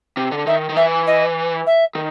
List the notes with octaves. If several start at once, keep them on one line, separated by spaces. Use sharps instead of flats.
C3
D3
D#3 E5
D#3
E3 E5
D#5
E5
D#3